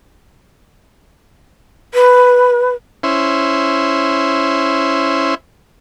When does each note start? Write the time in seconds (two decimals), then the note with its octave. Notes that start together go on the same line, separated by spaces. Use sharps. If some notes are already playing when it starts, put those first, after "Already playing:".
1.94 B4
3.03 C#4 E4 C5